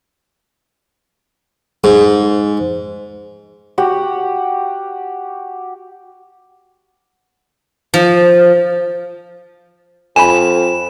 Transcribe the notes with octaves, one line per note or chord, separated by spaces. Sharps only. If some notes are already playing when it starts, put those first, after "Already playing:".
G#2
F#4 G4 F#5
F3
F2 G#5 B5 E7